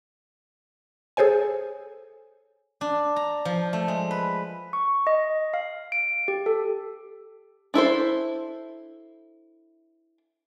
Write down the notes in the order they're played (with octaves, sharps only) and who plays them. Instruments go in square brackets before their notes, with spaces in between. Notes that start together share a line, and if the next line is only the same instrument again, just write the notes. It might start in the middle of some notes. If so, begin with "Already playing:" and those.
[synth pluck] G#4 A4 C5 C#5 G#5
[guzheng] D4
A#5
F3
A3
G#3
B4
[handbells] C#6
D#5
F5
D7
G4
A4
[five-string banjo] D4 E4 A4 C5